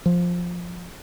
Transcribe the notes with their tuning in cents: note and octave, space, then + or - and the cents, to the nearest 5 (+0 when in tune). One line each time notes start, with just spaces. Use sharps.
F3 +10